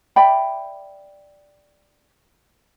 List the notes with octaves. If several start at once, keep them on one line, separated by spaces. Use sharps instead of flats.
D5 E5 G5 B5